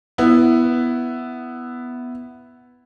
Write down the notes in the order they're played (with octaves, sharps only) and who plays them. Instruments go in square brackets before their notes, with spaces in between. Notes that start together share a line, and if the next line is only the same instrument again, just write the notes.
[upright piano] B3 E4